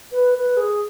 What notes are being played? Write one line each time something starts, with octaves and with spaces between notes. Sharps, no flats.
B4
B4
G#4